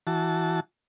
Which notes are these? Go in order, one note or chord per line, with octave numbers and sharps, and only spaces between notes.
E3 F#4 A5